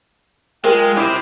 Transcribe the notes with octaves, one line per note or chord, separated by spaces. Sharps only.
G#3 F4 G#4 A#4 G5
E4 G4 C5